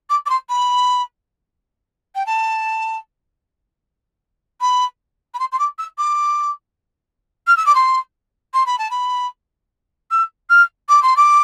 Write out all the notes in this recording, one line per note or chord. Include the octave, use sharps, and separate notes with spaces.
D6
D6
C6
B5
G5
A5
B5
B5
C6
C6
D6
E6
D6
F6
E6
D6
C6
C6
B5
A5
B5
E6
F6
D6
C6
D6